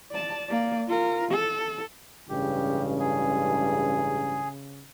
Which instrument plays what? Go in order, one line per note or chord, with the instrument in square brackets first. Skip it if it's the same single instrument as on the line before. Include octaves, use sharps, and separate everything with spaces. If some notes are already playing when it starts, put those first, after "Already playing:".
[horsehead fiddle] D5 A5
A#3 D5
F4 A#4
A4
[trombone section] A1 G2 G#3 [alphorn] C#3 [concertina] G4
[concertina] G#4